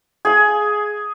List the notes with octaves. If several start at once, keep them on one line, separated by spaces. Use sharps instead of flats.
G#4 G#5